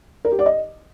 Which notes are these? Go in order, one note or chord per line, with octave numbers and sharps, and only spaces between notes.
A#4
G4
D5
D#5